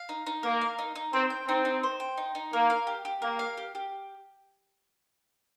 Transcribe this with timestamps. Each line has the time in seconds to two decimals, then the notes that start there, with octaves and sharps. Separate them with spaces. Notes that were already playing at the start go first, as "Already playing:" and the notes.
Already playing: F5
0.09 D#4
0.27 D#4
0.43 A#3 A#4
0.61 F5
0.79 D#4
0.95 D#4
1.13 C4 C5
1.30 G5
1.47 C4 D#4
1.65 D#4
1.83 C5
2.00 G5
2.17 D#4
2.35 D#4
2.53 A#3 A#4
2.70 F5
2.87 G4
3.05 G4
3.22 A#3 A#4
3.39 F5
3.57 G4
3.75 G4